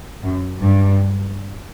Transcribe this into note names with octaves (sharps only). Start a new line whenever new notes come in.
F#2
G2